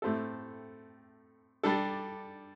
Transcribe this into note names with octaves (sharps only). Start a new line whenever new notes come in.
A2 A3 C4 A4
G3 D4 A4